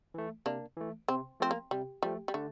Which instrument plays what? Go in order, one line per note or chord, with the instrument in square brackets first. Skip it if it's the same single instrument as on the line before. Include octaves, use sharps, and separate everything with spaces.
[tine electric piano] E3 A3
[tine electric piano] C3 [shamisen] A#3 D4
[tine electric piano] E3 A3
[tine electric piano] C3 [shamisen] C4
[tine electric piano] F3 A3 [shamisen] C4
[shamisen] A#3
[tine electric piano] C3 [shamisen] G3
[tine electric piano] F3 A3 [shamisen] G3
[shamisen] G3
[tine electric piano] D3 [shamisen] A3